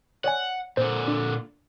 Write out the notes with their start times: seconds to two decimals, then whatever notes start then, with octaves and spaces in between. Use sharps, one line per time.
0.24 C#5 D5 F#5 G#5
0.77 A#2 D3 C5
1.08 D4